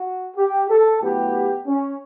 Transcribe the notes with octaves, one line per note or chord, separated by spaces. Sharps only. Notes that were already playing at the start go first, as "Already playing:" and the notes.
Already playing: F#4
G4
A4
A2 F#3 B3 G4
C#4